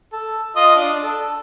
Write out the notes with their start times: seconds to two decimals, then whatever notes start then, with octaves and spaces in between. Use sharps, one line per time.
0.13 A4
0.56 F4 D#5 D#6
0.76 D4
1.03 A4